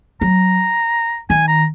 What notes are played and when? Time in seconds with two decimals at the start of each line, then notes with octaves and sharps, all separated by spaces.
0.21 F#3 A#5
1.30 D#3 G#5
1.48 A#5